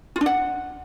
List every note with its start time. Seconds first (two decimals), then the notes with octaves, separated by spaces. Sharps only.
0.16 F4
0.21 D4
0.26 F#5